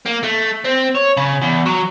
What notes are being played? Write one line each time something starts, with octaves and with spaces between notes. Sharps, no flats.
A#3
A3
C4
C#5
C#3
E2
F#3